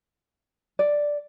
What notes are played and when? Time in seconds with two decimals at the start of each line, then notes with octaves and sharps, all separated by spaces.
0.79 D5